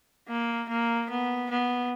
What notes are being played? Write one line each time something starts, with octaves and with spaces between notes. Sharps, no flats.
A#3
A#3
B3
B3